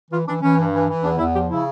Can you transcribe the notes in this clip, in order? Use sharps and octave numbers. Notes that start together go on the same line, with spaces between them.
E3 F4
E3 D4
E3 C#4
G2
E3
E3
E2 D4
E2 E4
F3 G4
C#3 E4